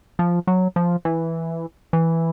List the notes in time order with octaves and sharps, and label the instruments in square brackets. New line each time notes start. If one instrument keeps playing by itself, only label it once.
[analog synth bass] F3
F#3
F3
E3
E3